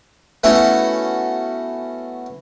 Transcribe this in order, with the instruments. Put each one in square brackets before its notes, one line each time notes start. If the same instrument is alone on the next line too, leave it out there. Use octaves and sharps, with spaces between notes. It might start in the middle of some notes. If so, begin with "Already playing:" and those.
[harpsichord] A3 B3 C#4 E4 F#4